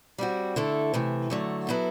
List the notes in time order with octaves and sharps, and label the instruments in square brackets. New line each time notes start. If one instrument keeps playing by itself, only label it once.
[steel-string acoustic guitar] G3 C4 F#4
D3 A3 E4 A4
C3 E3 A3
D3 F#3 A3
F#3 B3 E4 A4